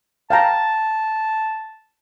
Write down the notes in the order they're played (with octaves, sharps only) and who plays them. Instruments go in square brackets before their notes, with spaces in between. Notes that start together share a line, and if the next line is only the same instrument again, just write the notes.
[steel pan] F5 G5 A#5 [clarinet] A5